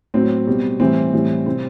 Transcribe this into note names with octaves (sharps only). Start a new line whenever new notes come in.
A2 F#3 C4
B2 G3
A2 E3 G3 C4
A2 E3 G3
C3 G3 C4